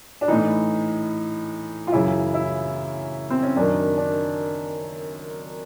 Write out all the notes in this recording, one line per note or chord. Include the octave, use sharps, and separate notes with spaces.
D4
A2 E3 D#4
F4
F#2 C#3 E3 E4
E4
C4
C#4
F#2 D#3 D4
D4